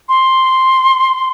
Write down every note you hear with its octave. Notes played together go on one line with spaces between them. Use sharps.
C6